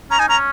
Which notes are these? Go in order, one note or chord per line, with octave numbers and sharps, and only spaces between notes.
C#4 A#5
D#4 G#5
C#4 A#5